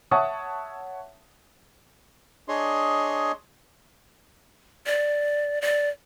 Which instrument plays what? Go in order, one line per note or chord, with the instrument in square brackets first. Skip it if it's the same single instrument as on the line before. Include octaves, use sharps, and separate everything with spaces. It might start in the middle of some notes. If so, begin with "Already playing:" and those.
[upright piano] C#5 E5 F#5 A5 C#6 D#6
[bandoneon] D4 G#4 C#5 D#5 C6
[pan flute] D5
D5